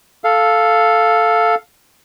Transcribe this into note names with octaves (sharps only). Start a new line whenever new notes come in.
A4 F5